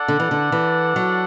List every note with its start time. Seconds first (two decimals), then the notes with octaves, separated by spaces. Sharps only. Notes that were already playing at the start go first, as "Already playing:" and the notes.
Already playing: D4 A4 D5 F#5
0.08 D3
0.20 E3
0.31 D3
0.52 E3
0.96 F#3